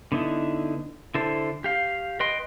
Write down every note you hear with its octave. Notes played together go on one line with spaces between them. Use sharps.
D3 B3 D#4 E4
D3 E4 A4 C5
G4 F5
B4 D#5 G5 C6